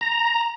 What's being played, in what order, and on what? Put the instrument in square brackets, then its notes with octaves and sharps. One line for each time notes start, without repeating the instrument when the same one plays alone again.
[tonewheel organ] A#5